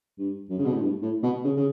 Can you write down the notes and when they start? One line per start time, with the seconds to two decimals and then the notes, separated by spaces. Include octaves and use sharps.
0.18 G2
0.50 F#2
0.58 C#3
0.66 B2
0.73 A2
0.81 G2
1.02 A2
1.23 B2
1.44 C#3
1.57 C#3